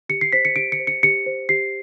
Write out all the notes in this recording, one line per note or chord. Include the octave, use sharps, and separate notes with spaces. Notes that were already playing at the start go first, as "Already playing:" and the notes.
G4 C#7
C7
C5 B6
C#7
G4 D7
C#7
C5
C#7
G4 C#7
C5
G4 C7